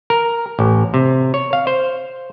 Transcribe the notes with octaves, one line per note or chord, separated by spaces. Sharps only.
A#4
A1
C3
C#5
F5
C5